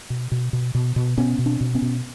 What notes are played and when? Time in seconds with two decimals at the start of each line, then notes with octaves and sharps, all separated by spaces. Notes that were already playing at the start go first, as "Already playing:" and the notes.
0.10 B2
0.32 B2
0.53 B2
0.75 B2
0.96 B2
1.18 B2 B3 C#4
1.39 B2
1.46 C4 D4
1.61 B2
1.75 B3 C#4
1.82 B2